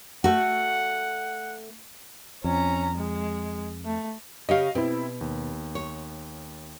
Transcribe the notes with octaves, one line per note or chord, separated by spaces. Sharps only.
A3 F#4 F#5
F2 C#4 A#5
G#3
A3
C#3 G4 C#5 D#5 F5
B2 C4 E4
D#2
C#5